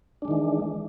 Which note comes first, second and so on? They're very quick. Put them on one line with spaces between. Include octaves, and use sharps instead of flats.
D4 G#3 D#3 E3